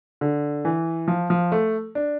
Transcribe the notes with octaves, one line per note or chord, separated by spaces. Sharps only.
D3
E3
F3
F3
A3
D4